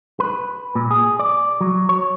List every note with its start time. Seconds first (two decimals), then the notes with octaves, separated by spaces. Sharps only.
0.20 B4
0.75 A#2
0.91 G#4
1.19 D5
1.61 F#3
1.89 C#5